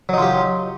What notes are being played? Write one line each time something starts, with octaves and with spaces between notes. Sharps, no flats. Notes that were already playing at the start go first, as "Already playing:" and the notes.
F#3 D#4 F4 G4